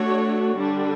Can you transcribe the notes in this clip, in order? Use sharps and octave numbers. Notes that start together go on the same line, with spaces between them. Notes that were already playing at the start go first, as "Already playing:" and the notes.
Already playing: A3 D4 F#4 C#5
D3 G3 D4